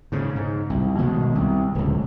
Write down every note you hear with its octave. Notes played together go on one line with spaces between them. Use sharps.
G#2 C#3
G#2
C2
B2 D#3 F#3 G#3
C2
D1 C#2